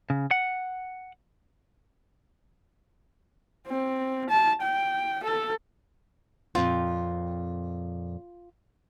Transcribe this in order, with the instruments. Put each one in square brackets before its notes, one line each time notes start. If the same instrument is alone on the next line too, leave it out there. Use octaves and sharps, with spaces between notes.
[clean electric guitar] C#3
F#5
[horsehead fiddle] C4
A5
G5
A4
[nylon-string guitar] F2 A#2 C4 [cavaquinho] F4